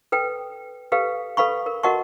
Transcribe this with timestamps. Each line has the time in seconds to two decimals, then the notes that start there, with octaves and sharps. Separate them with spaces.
0.12 A4 B4 G5
0.92 G4 A4 B4 F5
1.37 A4 B4 F5 B5 C#6
1.66 A#4
1.83 F#4 A#4 D#5 F#5 A5 C#6